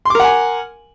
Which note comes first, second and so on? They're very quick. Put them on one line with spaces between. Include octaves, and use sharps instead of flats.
C6 D6 A#4 F#5 G#5